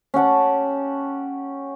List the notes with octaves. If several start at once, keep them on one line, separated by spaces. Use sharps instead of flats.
C#4 G4 F#5 A5